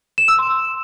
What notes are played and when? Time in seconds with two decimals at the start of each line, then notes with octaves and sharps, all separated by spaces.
0.18 E7
0.28 E6
0.39 C6